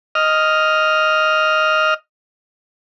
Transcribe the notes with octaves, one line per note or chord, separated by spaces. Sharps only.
D#5 F6